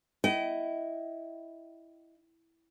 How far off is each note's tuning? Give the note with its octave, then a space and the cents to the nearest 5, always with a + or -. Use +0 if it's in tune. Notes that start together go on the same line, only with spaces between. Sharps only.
E4 +0 D#5 +0 G5 -35